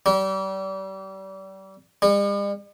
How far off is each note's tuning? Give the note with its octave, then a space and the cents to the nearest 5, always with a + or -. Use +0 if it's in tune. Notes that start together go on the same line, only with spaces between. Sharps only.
G3 -35
G3 +45